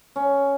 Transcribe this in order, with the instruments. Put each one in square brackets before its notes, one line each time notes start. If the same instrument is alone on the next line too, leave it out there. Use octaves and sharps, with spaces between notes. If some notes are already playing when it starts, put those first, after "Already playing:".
[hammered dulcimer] C#4